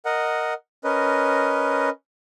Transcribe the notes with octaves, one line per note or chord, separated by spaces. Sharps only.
A#4 D#5 F#5
C#4 A#4 B4 D#5